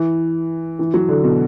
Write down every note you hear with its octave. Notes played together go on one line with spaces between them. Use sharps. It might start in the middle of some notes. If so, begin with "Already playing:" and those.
Already playing: E3
E3
F#3
D3
B2